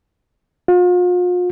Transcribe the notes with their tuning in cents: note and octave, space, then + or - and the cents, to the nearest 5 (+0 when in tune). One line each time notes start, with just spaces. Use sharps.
F4 +40